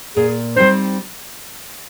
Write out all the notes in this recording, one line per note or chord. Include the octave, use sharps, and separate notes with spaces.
A#2 G#4
G3 C4 D#4 C5